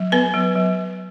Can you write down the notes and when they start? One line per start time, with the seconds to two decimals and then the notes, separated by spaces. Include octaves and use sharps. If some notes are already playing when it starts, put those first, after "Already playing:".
Already playing: F#3
0.12 B3 B4
0.34 F#3
0.55 F#3